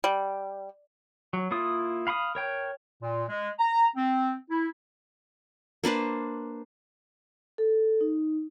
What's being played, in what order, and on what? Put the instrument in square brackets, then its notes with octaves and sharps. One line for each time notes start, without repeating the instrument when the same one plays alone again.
[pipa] G3
[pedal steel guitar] F#3
A#3 E4 F4 D#6
F5 B5 C6 D#6
A#4 C#5 G5
[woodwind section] A#2
G#3
A#5
C4
E4
[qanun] A#3 D4 B4 C5
[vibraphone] A4
D#4